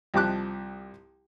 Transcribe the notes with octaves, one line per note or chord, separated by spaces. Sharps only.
C2 F3 G4 A5 D6 F#6